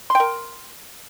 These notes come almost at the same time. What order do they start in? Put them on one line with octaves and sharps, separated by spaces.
C6 G5 A#4